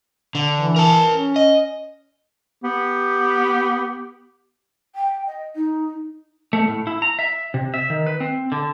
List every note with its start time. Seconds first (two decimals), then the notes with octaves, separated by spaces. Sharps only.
0.35 D3
0.56 E3
0.76 A#4 A5
1.12 C#4
1.36 D#5
2.63 B3 G4
4.95 G5
5.26 D#5
5.55 D#4
6.53 A3
6.68 A2
6.87 E4
7.02 A#5
7.19 E5
7.54 C3
7.74 E5
7.90 D#3
8.06 B4
8.20 C4
8.52 D3